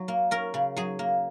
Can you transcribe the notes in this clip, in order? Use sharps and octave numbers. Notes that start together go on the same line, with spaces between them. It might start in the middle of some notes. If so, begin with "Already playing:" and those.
Already playing: F#3
A#3
C#4 A#4
C#3
F#3 G#4
A#3